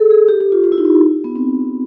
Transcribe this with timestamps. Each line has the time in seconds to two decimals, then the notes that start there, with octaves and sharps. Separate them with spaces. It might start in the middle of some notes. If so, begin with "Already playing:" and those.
Already playing: G#4 A4
0.10 G#4
0.28 G4
0.41 G4
0.52 F4
0.64 F4
0.72 E4
0.78 D#4
0.85 E4
1.24 B3
1.36 C4